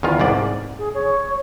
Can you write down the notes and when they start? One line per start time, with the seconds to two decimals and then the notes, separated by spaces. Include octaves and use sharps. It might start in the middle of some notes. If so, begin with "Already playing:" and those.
0.03 E2 D#3 F4
0.20 C2 G#2 D5
0.78 G#4
0.94 C#5